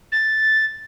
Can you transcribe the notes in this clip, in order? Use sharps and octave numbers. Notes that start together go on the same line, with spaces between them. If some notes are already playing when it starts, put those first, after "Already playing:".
A6